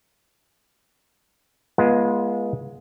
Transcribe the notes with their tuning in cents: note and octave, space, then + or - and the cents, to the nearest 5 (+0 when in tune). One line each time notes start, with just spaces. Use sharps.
G#3 +0 B3 -35 F4 -15